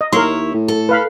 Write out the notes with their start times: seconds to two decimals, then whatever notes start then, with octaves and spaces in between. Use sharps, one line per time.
0.01 D#5
0.12 D#2 E4 A#4 C#5 C6
0.54 A2
0.68 A4
0.89 B4 F5 B5